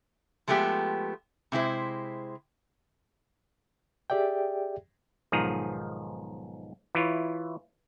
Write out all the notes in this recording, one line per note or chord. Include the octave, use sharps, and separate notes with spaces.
F3 G#3 A3 B3 G4
C3 G#3 E4 C5
G4 G#4 D5 E5 G5
B1 G#2 D#3 F3 G#4 A#5
E3 E4 F4 C#5